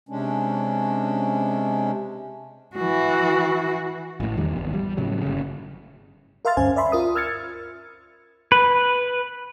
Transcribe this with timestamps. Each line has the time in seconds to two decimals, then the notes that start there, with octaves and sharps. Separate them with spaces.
0.09 C3 G#3 C#4 D4
2.76 E3 F#4
4.20 A1 A2
4.37 E2 D#3 G3
4.56 G#1 E2
4.73 G3
4.97 A2 C#3 F#3
5.21 G1 C#3
6.45 A#4 E5 F5 C6 F6 A6
6.57 D2 G2 C#4 C5 G#5
6.76 D5 E5 B5 C6
6.92 F4 A#4 D#6
7.16 E6 F6 G#6 A6 C#7
8.52 B4